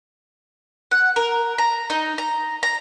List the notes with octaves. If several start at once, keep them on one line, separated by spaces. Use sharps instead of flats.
F#5
A#4
A#5
D#4
A#5
A#5